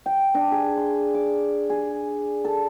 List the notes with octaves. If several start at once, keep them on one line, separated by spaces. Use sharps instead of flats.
G5
D4
G#4
C6
D6
G#4
A4